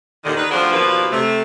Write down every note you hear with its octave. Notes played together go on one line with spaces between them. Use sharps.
D#2 A#2 D3 D#3
D#3 B4
D2 G2 F3 D4 G#4 F#5
D#2 B2 F3 A#3 B4 D5
C3 A3